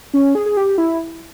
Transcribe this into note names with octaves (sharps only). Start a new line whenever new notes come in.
C#4
G#4
G#4
G4
E4